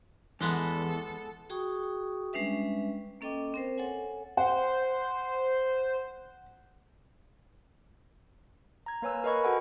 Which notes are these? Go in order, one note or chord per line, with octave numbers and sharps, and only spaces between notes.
E2 E3 G#3 B3 A4
F#4 G#4 G5 C#6 D#6
G3 G#3 C#4 D4 B4 E5
A#3 C#4 A4 D#5 G5 D6
C4 A#4 C5
A4 C#5 F#5 G#5
C5 F#5
A#5 G#6
A#3 B4 C#5 G#5 E6
A#4 B4 D#5 B5 C#6 G#6
F#4 A4 F#5 G#5